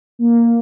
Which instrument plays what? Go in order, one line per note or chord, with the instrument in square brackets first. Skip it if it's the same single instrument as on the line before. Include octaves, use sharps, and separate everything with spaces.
[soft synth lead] A#3